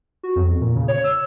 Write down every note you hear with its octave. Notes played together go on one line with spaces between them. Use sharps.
F#4
F2
E2
A#2
C#3
C#5
E6